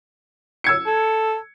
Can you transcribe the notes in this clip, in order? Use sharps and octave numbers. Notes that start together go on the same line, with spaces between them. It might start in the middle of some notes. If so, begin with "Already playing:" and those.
E6 G#6 C#7
A4